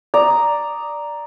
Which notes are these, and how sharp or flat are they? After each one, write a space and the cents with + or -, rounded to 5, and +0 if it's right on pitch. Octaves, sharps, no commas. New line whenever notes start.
D5 +0 A#5 +0 D#6 +0